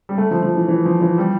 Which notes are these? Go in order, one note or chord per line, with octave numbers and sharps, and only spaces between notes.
G3
A3
F3
F3
E3
E3
F3
E3
G3